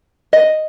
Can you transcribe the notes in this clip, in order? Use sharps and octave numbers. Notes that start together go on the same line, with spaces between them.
D#5